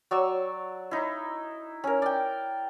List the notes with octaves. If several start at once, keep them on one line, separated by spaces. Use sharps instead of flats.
F#3 D5 C#6 E6
D#4 E4
C#4 A#4
D5 G5